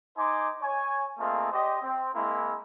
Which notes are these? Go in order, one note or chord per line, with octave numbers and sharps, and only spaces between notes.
D#4 C5 G#5 C6 D6
C#5 G#5
A3 A#3 C4 F4 G#4 D#5
G4 C5 D5 D#5
C4
G#3 A#3 C4 E4